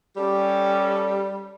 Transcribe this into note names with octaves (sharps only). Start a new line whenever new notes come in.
G3 C#4 G4 A4